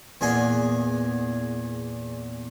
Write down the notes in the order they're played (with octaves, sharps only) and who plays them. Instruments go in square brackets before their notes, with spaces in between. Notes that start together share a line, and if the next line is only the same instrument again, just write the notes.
[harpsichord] E2 A#2 G#4 D#5 F#5 G#5